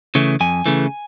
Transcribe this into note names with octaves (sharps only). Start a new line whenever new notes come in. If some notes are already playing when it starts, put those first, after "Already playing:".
C#3 E3 A3
F2 G#5
C#3 E3 A3